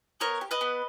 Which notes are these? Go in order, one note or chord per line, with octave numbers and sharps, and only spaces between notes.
B3 A#4 C#5
G4
B4 D#5
B3